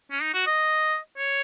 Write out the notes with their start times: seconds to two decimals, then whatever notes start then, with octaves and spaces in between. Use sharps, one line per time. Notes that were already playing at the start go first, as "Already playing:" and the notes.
0.11 C#4
0.22 D#4
0.34 F#4
0.47 D#5
1.18 C#5